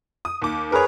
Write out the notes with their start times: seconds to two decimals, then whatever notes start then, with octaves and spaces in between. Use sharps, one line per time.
0.25 D#6
0.42 D#2 D6
0.72 G#4 A#4 B4 C#5